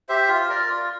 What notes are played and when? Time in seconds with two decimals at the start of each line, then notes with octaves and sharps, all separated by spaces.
0.09 G4 C5 E5
0.28 F4
0.49 A#4 D5
0.69 F4